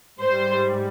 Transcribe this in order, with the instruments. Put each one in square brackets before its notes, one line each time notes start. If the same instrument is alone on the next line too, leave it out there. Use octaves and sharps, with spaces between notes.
[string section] G#2 G3 C5